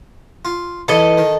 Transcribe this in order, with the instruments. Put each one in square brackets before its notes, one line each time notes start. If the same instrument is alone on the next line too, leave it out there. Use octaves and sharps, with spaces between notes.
[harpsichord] F4
[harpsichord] E3 [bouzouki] A4 D#5
[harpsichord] D#3